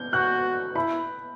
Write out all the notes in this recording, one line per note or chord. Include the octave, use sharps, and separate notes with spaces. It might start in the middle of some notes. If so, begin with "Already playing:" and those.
Already playing: G6
F#4 F#6
E4 B5